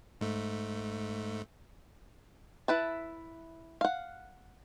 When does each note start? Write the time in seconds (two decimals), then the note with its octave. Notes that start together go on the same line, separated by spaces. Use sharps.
0.21 G#2 A3
2.68 E4 B4 A5
3.81 F5 F#5